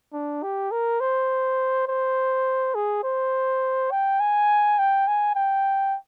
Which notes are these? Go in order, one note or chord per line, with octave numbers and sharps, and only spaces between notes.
D4
G4
A#4
C5
C5
G#4
C5
G5
G#5
G5
G#5
G5